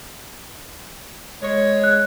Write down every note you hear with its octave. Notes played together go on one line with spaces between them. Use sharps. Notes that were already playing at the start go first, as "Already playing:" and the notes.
G#3 C#5
F#6